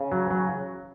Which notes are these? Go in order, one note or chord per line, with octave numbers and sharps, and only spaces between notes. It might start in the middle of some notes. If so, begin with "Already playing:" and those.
Already playing: C#3
F#3
F#3